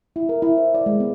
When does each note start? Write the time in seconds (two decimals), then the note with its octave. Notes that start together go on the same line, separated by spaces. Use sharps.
0.16 E4
0.29 A#4
0.42 E4
0.57 C5
0.75 D5
0.86 G#3
1.00 B3